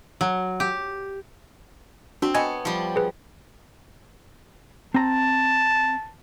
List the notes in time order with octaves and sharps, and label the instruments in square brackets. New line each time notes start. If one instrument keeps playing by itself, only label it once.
[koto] F#3
G4
[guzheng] C4 [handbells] D4 F#4
[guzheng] B3 C#5 A5 [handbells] D#5 G#5 G#6
[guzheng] F3 G3
[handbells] G#4 B4
[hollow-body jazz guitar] C4 A#5 [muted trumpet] A5